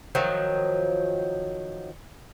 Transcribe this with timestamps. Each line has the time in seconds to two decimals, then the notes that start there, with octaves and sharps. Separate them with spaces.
0.15 D#3 F3 F#3